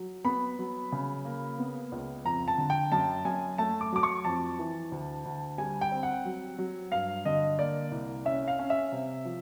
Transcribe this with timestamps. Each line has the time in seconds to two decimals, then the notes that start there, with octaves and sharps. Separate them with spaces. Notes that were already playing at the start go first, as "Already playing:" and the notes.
Already playing: F#3
0.25 B3 B5
0.59 F#3
0.92 C#3
1.25 A#3
1.59 B3
1.92 C#2
2.25 F2 A#5
2.48 A5
2.58 D3
2.70 G5
2.92 F#2 A5
3.25 F#2 G#5
3.58 A3 A5
3.81 D6
3.92 F#3 D6
4.03 C#6
4.25 F2 A5
4.59 E3
4.92 D2
5.25 D2
5.58 G3 G#5
5.81 G5
5.92 C4
6.03 F#5
6.25 F#3
6.59 F#3
6.92 G2 F5
7.25 D3 D#5
7.59 A#3 D5
7.91 C2
8.25 C#4 E5
8.48 F5
8.59 C#4
8.70 E5
8.92 C3
9.25 F3